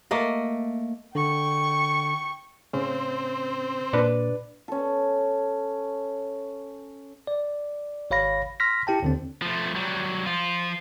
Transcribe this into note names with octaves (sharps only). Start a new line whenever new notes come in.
A3 A#3 D#5
D3 G5 C#6
A2 C#3 C4 C#4
A#2 D4 B4 D5
C#4 A4
D5
G#1 C#5 F5 B5 A#6
C6 F6 A#6 B6
E4 G4 G5 A5
D#2 D3 C4
F3 A3
F#3 G3
F3 F4